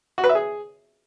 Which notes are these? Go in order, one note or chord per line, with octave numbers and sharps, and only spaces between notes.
F#4
B4
E5
G#4